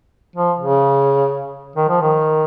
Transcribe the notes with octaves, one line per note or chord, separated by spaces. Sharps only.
F3
C#3
D#3
F3
D#3